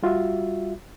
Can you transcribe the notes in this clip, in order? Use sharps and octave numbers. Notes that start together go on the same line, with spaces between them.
G3 F4 F#4 E5